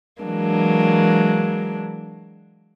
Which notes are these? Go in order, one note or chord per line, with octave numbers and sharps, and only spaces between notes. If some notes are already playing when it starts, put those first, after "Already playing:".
E3 F#3 G#3 A#3 D4